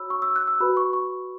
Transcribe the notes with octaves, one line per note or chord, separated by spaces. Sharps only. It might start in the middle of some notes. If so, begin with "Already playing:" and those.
Already playing: F#4 C#5 B5 E6
C#6
E6
F#6
E6
F#4 B4 B5
C#6
C#6